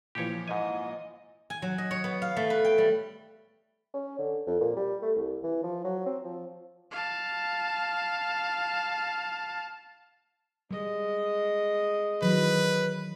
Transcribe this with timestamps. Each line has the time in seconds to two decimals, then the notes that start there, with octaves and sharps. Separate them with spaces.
0.15 A#2 E3 F3 G4 C#5
0.48 G#2 D#5 G#5
1.50 G#5
1.62 F#3
1.78 D#5
1.91 C#5
2.04 B3
2.22 F5
2.36 A3
2.50 B4
2.64 G5
2.78 G3
3.94 C#4
4.19 D3
4.47 F2
4.61 A#2
4.76 G3
5.02 A3
5.16 C2
5.43 E3
5.63 F3
5.84 F#3
6.06 C4
6.24 F3
6.91 F5 A5
10.71 G3 G#3 D#5
12.22 D#3 E3 F#3 B4